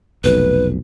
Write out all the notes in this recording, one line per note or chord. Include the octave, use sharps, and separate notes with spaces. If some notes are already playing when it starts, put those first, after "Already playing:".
F1 B1 B4